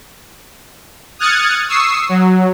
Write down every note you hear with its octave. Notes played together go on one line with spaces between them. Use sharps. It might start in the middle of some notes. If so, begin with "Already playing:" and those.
D#6 F6 F#6 G#6 A6 C#7
C#6 D#6 E6 C7
F#3